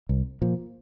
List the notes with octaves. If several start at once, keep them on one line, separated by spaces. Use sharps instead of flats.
C2
A#2 F3